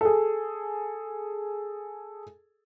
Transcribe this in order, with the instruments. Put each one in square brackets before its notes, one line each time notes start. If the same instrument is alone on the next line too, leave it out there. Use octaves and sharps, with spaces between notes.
[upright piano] G#4 A4